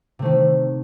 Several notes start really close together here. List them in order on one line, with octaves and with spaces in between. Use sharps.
C3 A3 D#3